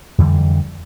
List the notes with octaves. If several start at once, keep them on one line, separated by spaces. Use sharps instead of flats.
F2 D3 E3 G3